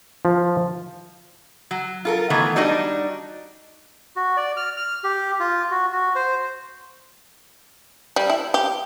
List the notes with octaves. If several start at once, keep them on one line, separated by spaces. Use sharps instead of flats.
F3
F#3
F4 A4 A#4
D#3 E3 F#3 A3 B3
G3 D4 D#4 F#4 D#5
F#4
D5
F6
F6
G4
F4
F#4
F#4
C5
G3
E4
G4